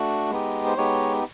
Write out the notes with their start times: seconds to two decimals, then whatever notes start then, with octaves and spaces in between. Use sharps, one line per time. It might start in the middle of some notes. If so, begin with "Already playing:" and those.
Already playing: A3 D4 F#4
0.31 G#3 B3 D#4 G4
0.66 C5
0.77 G#3 B3 D#4 G4 C#5